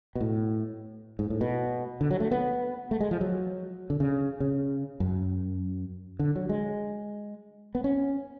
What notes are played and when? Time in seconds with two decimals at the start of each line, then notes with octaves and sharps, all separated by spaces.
0.15 B2
0.21 A2
1.19 G#2
1.30 A2
1.41 B2
2.01 D3
2.11 F#3
2.20 A3
2.31 B3
2.91 A3
3.01 G#3
3.11 F3
3.21 F#3
3.90 D3
4.00 C#3
4.40 C#3
5.00 F#2
6.19 D3
6.36 F#3
6.49 G#3
7.75 B3
7.84 C#4